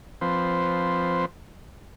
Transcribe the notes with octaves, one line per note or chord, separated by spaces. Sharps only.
F3 C4 B4 C5